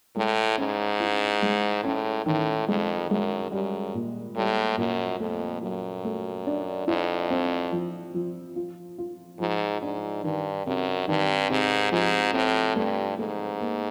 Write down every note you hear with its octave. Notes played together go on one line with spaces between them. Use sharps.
A2 G#3
G#2 C#4
E4
G#3
A2 C#4
A2 D#3
F2 G#3
F#2 G#3
F#2 G3
A#2
A2 G3
F#2 A#2
F2 A3
F#2 F#3
A3
D4
F2 E4
C4
F3
F3
F4
F4
G#2 F3
G#2 D4
G2 D#3
F#2 C3
G2 D#3
G#2 C3
G#2 F3
A2 C4
G2 A3
G#2 A3
A#3